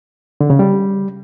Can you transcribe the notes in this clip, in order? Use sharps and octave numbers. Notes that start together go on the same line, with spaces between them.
D3
C#3
G3